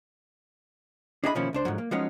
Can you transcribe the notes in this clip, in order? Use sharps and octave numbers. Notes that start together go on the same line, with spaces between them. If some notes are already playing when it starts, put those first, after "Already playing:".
D4 E4 G#4 D#5 F5 B5
B2 D#3 F3 A#3 C#4 E4
C#2 D4 C5
G#2 D3 F3 F#3
A#3
F3 F#3 G#3 B3 C#4 D#4